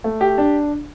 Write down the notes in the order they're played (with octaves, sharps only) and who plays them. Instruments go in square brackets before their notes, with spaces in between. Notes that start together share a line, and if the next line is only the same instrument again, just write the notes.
[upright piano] A3
G4
D4